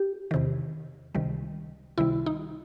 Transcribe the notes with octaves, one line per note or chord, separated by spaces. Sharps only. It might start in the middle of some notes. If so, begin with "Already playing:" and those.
Already playing: G4
E2 C3 D#3
C#2 C3 D#3 G3
C#2 C3 D#3 G3 E4
D#4